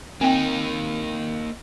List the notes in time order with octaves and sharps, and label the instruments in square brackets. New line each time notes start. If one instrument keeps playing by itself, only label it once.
[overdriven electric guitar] A#3 D#4 [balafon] C4 G5